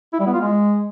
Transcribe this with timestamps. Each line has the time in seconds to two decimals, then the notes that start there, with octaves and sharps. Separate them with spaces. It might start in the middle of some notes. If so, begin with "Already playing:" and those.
0.13 E4
0.20 G3
0.26 B3
0.33 F4
0.40 G#3